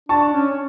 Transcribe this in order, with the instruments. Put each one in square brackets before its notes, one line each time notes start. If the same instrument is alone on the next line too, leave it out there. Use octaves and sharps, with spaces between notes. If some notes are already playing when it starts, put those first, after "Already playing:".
[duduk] D4 [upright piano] A5 C#6
[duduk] C#4
C#4